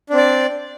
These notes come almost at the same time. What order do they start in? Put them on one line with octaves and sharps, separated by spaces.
D4 C4 D5